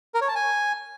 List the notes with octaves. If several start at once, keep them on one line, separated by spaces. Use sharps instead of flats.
A#4
C#5
A5
G#5